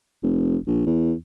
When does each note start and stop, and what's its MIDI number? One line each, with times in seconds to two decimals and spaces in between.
0.23 0.57 29
0.67 0.83 34
0.86 1.14 40